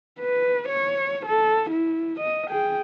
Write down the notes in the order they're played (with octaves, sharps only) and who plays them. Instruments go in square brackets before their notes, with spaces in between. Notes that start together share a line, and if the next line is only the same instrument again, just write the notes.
[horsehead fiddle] B4
C#5
A4
E4
D#5
G#4 G5